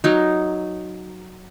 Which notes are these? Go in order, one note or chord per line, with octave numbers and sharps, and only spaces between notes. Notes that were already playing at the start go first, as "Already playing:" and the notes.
F#3 D#4